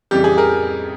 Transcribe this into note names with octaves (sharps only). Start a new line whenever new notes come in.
F2 C#3 E3 G3 G4
G#4
G#4 A#4